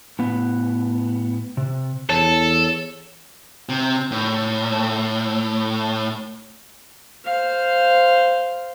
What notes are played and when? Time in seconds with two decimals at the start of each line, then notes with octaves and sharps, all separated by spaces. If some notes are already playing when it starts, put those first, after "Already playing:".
0.19 A2 B3
1.57 C3
2.10 E2 A4 C#5
3.69 C3
4.12 A2
7.25 C5 F5